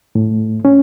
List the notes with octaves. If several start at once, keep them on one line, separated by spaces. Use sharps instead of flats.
A2
C#4